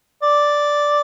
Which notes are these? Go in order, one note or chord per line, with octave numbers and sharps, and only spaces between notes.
D5